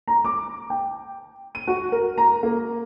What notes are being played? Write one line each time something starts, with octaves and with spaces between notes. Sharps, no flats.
A#5
D6
G5
D#7
F#4
A#4
A#5
A#3